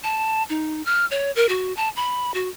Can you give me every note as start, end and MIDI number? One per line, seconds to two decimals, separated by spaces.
0.04 0.43 81
0.50 0.82 63
0.86 1.06 89
1.11 1.32 73
1.36 1.48 70
1.49 1.75 66
1.77 1.89 81
1.96 2.34 83
2.34 2.49 66